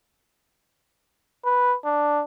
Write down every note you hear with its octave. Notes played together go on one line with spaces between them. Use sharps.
B4
D4